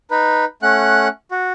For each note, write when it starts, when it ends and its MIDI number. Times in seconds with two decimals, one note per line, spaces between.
0.11 0.45 63
0.11 0.45 71
0.63 1.08 57
0.63 1.08 61
0.63 1.08 78
0.63 1.08 90
1.31 1.53 66